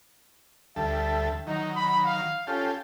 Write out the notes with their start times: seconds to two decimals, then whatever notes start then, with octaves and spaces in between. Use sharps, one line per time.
0.76 D2 G3 A4 E5
1.47 D#3 F#3 D#4
1.76 B5
2.05 F5
2.47 C#4 F4 G4 A4